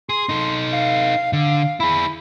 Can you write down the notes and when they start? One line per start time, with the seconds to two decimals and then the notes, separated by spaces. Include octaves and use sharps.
0.09 G#4 C6
0.29 D#4 A4
0.73 F5
1.33 D3 F5
1.80 E4 G#4 B5